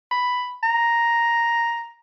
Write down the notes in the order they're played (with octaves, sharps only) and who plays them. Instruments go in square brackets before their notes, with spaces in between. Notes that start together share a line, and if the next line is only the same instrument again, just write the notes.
[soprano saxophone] B5
A#5